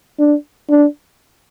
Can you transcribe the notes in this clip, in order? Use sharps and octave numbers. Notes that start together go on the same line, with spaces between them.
D4
D4